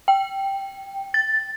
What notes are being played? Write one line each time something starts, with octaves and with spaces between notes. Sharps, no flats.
G5
A6